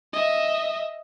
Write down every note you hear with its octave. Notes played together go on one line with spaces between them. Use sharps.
D#5 E5